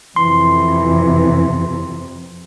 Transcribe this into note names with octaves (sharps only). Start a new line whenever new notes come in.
F2 C3 E3 C6